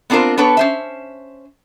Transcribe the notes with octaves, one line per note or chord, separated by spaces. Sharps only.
B3 C4 D4 F4 A#4 C5
B3 D4 A4 B4 C#5
C#4 C5 E5